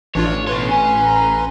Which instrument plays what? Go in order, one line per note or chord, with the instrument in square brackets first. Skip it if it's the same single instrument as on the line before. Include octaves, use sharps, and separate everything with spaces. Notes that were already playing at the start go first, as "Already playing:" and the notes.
[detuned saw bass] A1 [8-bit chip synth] E3 D4 F4 [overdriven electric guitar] C#5
[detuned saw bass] A1 [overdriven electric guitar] B2 C#5 [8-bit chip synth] B4 C6
[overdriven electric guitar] C#4 G#5
[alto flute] A#5